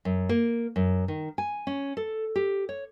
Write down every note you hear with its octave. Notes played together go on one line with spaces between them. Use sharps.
F#2
A#3
F#2
D#3
G#5
C#4
A4
G4
C#5